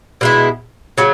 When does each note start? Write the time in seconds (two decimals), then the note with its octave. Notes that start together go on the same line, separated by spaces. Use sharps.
0.21 B2 G#3 E4
0.98 C#3 F#3